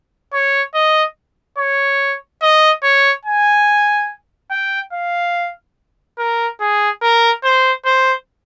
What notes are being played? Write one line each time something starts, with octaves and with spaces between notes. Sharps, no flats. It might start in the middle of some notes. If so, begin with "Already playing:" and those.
C#5
D#5
C#5
D#5
C#5
G#5
G5
F5
A#4
G#4
A#4
C5
C5